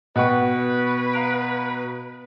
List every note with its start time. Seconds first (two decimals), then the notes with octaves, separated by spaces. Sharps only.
0.16 B2 B4 D#5 F#5 G5 C#6
1.13 F5 A#5 D7